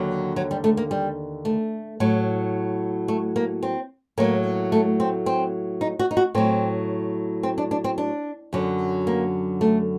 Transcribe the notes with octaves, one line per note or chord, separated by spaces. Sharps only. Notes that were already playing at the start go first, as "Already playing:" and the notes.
Already playing: D#2 D3 F#3
F#3
G3
A3
A#3
G3
A3
A2 F#3
A3
A#3
C4
A2 F#3 A#3
A3
C4
C4
D#4
F#4
D#4
F#4
A2 F#3 C4
C4
D4
D4
C4
D4
F#2 D3 F#3
A#3
A3